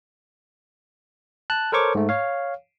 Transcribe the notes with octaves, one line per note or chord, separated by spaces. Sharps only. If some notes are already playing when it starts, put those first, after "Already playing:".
A5 F#6
A4 A#4 C5 C#5 C#6 D6
G#2 A3
C#5 F5